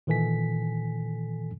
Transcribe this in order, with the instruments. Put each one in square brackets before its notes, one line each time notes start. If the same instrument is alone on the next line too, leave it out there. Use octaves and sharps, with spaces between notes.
[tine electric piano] A#2 D#3 E3 A4 G#5 B6